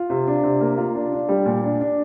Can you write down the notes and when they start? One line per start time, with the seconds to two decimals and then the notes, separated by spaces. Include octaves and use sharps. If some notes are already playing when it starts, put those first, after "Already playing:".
Already playing: F4
0.10 C3
0.27 D4
0.43 C3
0.61 A#3
0.78 F4
0.95 D4
1.12 D4
1.29 G3
1.46 A#2
1.63 D4
1.81 D4